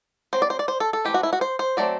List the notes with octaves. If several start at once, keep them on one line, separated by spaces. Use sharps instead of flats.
F#3 C4 C5
D5
C5
D5
C5
A4
A4
E3 A3 C4 G4
F#4
E4
F#4
C5
C5
F#3 A3 C4 D5